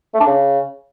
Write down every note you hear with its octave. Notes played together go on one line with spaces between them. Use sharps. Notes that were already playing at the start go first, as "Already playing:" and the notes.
A3
D4
C#3